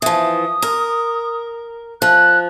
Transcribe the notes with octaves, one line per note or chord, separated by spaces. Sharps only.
E3 F3 D#6
A#4
F3 F#6